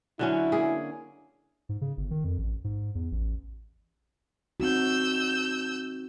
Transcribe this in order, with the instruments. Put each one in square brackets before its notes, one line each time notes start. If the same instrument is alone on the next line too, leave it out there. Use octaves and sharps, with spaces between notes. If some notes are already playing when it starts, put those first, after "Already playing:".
[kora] D3 F#3 C#4 [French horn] E4
[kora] A#3 G#4
[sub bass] G#2
C#3
G1
D#3
F2
A1
G#2
E2
A1
[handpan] C4 D#4 F#4 [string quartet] E6 G6